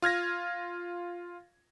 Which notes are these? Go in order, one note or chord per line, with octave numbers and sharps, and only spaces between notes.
F4 F6 G#6 A#6